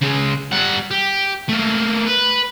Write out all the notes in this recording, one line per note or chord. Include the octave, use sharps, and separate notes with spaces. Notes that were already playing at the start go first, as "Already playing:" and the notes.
C#3 G#3
G3 F#5
G4
A3 A#3
B4